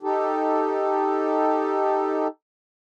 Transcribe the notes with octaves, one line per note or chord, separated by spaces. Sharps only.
D#4 G4 A4